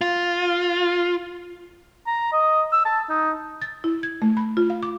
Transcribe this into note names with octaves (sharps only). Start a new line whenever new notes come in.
F4
A#5
D#5
E6
A5
D#4
A6
E4
G#6
A3
B5
F4
F5
D6